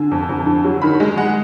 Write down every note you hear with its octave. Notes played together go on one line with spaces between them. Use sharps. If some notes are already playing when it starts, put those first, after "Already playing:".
Already playing: D3 G#5
F2
F2
D3
F#3
D#3 B5
G#3
G#3 F#5